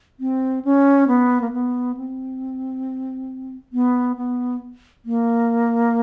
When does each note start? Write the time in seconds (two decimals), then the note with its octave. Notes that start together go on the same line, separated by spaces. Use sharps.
0.20 C4
0.65 C#4
1.08 B3
1.41 A#3
1.53 B3
1.97 C4
3.73 B3
4.17 B3
5.05 A#3